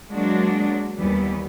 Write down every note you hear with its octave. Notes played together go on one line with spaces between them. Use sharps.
F#3 G#3 A#3 D4 F#4
D#2 E3 G3 B3